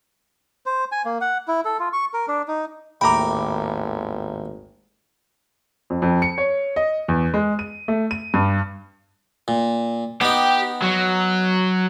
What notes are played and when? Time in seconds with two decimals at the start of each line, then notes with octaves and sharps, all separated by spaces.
0.66 C5
0.92 G#5
1.05 A#3
1.21 F#5
1.48 E4
1.65 A4
1.79 F4
1.93 C#6
2.14 A#4
2.28 D4
2.48 D#4
3.01 G#1 D#2 A2 G5 A#5 B5 D6
5.90 F2
6.02 F2
6.22 C#7
6.38 C#5
6.76 D#5
7.08 E2
7.34 G#3
7.59 D#7
7.88 A3
8.11 D#7
8.34 G2
9.48 A#2
10.21 B3 D#4 G4
10.82 F#3